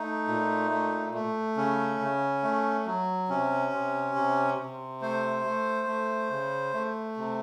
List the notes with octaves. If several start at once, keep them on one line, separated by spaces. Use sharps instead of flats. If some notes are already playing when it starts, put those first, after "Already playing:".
Already playing: A3 D#4
A#2
A3
A3
C#3 C#4
C#3
A3
F#3
C3 C#4
C3
C3
C3
A3 C5
A3
A3
C#3
A3
C3